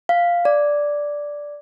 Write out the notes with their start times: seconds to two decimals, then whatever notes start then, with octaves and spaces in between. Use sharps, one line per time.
0.09 F5
0.45 D5